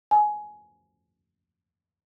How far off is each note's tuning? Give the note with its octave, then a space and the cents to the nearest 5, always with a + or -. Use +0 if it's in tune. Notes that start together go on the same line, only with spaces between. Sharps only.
G#5 +15